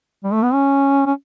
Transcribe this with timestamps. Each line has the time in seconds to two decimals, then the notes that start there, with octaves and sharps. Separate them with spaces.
0.24 G3
0.33 A3
0.43 B3
0.53 C#4
1.06 C#4